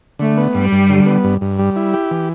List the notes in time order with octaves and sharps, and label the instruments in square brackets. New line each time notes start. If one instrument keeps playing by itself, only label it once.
[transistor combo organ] D3 [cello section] A3
[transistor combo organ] B3
[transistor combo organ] G2 [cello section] G3
[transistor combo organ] G2
D3
B3
G2
G2
G3
E4
G4
E3